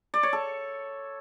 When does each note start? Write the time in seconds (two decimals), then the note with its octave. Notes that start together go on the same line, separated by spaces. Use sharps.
0.14 D5
0.23 C#5
0.33 A4